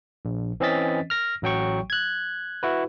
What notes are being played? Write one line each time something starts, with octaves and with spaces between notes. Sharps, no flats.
A#1
E3 C4 C#4 D#5 A6 B6
F6 A#6
A1 F#3 G5 C#6
F#6 G#6
E4 F#4 B4